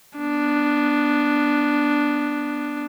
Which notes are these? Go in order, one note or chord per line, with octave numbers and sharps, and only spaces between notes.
B3 D4